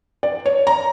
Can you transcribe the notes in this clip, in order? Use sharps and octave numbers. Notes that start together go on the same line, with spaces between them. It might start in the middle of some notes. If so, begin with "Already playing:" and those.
D5
C#5
A#5